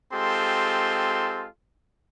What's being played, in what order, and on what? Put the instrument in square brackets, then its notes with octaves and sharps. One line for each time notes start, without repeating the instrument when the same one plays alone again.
[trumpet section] G#3 C4 F4 G4 A4 C6